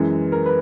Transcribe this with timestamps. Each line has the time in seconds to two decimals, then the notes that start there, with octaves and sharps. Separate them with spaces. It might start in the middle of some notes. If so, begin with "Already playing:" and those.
Already playing: F#2 E3 G#3
0.32 A#4
0.46 B4